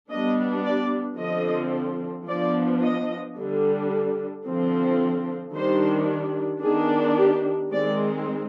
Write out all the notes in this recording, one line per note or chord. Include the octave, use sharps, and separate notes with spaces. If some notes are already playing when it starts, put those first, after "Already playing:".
G3 B3 D4 D#5
D5
D3 F3 C4 D#5
F3 B3 D4 D5
D#5
D3 G3 D4
D3 F3 C4
D#3 G3 D4 C5
D#3 B3 D4 G#4
G4
D#3 G#3 C4 D5